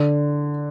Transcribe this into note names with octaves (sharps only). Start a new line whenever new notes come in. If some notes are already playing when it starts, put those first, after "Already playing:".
Already playing: D3